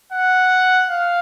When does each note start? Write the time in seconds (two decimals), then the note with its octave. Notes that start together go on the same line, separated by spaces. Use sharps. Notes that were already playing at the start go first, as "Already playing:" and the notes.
0.12 F#5
0.90 F5